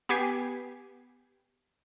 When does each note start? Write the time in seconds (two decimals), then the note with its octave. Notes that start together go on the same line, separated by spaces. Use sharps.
0.09 B3 G4 G#5 B6 C7